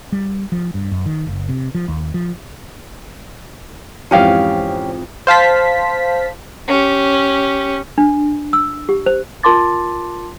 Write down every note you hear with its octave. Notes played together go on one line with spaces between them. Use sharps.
G3
F3
G2
F#2
D#3
F#1
C3
F3
D#2
F3
F2 G#2 E3 C#4 G4 F5
C5 F5 A5 B6
C#4 G4
D4
E6
G4
C5
F4 A#4 A5 C6 D6 A6